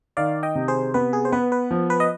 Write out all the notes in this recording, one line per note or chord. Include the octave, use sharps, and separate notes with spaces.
D#3 D5 F5
D#5 G5
C3
G#4 C5
B3 B4
G#4
C5
B3 B4
B4
F3
B4
D#5